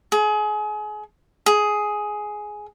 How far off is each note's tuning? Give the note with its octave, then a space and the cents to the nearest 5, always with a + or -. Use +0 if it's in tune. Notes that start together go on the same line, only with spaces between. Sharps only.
G#4 +30
G#4 +10